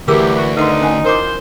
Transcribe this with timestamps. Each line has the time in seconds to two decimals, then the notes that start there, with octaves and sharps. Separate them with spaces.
0.08 D2 E3 F#3 G3 G4 G#4 A#4 E6
0.38 F#4
0.57 D3 D#3 D#4 B4 F#5 C6
0.81 C#4 F#5 G#5
1.05 E3 F4 A#4 C5 D6